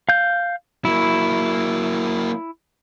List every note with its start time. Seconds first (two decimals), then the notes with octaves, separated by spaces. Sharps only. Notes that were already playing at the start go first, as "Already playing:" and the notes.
0.09 F5 G6
0.85 F#3 A#3 E4